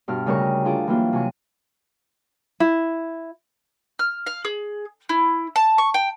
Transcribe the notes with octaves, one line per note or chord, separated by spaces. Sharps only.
G2 B2 F6
D2 C#3 G3 A#4 D#5 C#6
D4 F4 G#4 D5
E3 F#3 G3 A#3 F4
C3 F#3 G#5 C#6
E4
F6
F5
G#4
E4
A5
C#6
G5